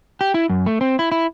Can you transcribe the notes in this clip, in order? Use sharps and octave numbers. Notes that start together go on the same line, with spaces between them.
G4
E4
F#2
A3
C4
E4
E4